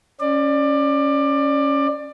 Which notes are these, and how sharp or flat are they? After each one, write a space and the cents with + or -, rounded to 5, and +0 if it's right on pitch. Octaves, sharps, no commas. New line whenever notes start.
C#4 +0 D5 +20